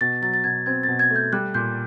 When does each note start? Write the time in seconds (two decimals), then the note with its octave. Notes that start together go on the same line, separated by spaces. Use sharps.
0.01 B2 A6
0.22 F#3 A6
0.34 A6
0.44 B2 G#6
0.66 C4 G#6
0.83 B2 A6
0.99 G#6
1.10 A3
1.16 G6
1.33 G3 F#6
1.54 A#2 G6